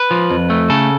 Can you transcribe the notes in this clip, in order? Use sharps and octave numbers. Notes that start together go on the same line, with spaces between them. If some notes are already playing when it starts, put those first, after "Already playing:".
Already playing: B4
F3
F2
A3
C#3 A4